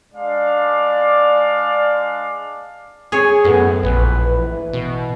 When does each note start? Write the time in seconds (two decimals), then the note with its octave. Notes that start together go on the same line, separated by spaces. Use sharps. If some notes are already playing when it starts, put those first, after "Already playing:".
0.14 G#3 D4 D5 F5
3.12 G#4 C#5
3.45 F#2 A2 B3
3.83 A#1 B4
4.37 E3
4.73 B2